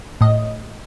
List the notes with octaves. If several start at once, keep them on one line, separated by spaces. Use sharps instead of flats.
A2 D#5